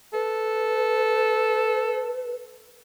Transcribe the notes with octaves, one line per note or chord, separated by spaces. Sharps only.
A4 B4